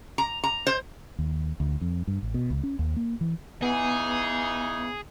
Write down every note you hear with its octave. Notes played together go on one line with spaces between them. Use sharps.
A#5
A#5
C5
D#2
D2
F2
G2
A1
B2
C#2
C#4
D#2
A#3
E3
C#3 E3 B3 D#4 G#4